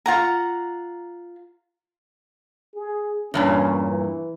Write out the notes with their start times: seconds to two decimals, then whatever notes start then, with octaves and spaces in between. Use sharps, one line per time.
0.06 F4 F#5 A#5
2.75 G#4
3.34 E2 G2 A#2 C#4
3.89 E3